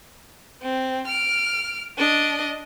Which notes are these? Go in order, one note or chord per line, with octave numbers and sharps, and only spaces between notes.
C4
F6 D7
D4 D#5